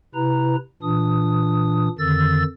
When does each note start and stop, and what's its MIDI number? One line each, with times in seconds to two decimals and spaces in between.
0.15 0.56 48
0.15 0.56 64
0.15 0.56 71
0.15 0.56 82
0.83 1.89 46
0.83 1.89 52
0.83 1.89 62
0.83 1.89 87
1.99 2.43 41
1.99 2.43 50
1.99 2.43 51
1.99 2.43 88
1.99 2.43 93